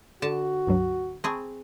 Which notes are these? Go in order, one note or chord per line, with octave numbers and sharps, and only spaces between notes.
D3 F#4 A5
C#2 G2 F#3
C4 G#4 A5 B5 C#6